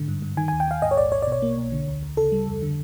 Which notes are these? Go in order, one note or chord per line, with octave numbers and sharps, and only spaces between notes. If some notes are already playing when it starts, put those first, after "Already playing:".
Already playing: G#2 D3
G2
G2
D#3 G#5
G#5
D#2
G5
D#2 F5
G#2 D#5
C#5
A#1 D5
A#1 C#5
D5
B2
C#5
A#3
B1
D3
D2
D2
C#3 A4
G3
F2
D3